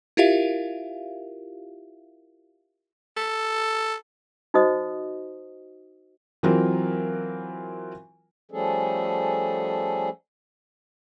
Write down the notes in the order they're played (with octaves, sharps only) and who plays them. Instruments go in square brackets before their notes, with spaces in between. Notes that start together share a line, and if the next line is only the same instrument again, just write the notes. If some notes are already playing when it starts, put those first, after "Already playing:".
[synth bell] E4 F4 G4 A#4 E5 F5
[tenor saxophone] A4
[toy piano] D#4 F#4 C5 D#5 D#6
[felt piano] E3 F#3 C4 F4 A#4
[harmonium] F3 G3 A3 C#4 G#4 A4